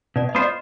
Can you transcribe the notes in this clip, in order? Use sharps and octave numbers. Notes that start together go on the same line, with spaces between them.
B2 D5
D#5
B3 F4 C5
D5